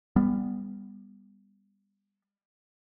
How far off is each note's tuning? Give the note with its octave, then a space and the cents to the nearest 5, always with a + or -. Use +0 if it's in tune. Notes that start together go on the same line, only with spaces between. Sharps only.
G3 +30 B3 +0